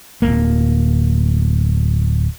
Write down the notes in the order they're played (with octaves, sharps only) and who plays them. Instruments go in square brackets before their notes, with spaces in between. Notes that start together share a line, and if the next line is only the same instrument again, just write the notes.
[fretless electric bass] D1 F2 A#3